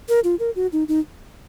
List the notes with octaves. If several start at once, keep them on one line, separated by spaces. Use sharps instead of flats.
A#4
F4
A#4
F#4
D#4
D#4